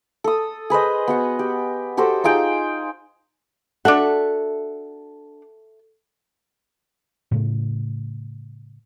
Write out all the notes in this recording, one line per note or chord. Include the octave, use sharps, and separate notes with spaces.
A4 D#6
G#4 B4 C5 D#5
B3 F#4 F#5
G4
F#4 G4 A4 C5
D#4 F4 G#4 G5
D4 F#4 A4 E5 F#5
A2 C#3 A3